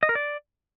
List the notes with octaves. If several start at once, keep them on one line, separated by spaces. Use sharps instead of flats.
D#5
A#4
D5